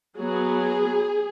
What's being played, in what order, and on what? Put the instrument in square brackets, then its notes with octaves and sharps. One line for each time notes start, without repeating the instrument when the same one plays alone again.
[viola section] F#3 B3 G#4